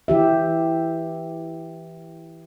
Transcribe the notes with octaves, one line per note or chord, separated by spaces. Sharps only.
E3 G4 E5